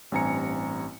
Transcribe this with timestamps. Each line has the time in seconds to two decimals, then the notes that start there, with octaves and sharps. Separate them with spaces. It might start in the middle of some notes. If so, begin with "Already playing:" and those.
0.12 A1 G2 C4 G#5 A#5 C#7